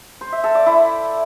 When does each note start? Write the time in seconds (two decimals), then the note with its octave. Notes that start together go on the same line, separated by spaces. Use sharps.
0.21 C5
0.32 E5
0.44 A4
0.55 D5
0.66 E4